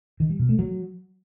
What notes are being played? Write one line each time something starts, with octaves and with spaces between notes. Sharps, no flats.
D#3
G3
B2
A3
F#3